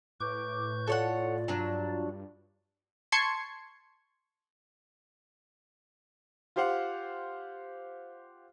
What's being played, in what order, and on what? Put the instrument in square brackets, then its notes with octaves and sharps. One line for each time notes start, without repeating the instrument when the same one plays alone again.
[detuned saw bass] A2 [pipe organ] B4 C#6 G6 [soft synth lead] D6
[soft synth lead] F4 [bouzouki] A4 C#5 F#5 [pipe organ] D5
[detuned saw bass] G2 [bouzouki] F#3 D4
[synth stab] A5 C6 C#6 G#6 C7 C#7
[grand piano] F4 G4 C5 F5 F#5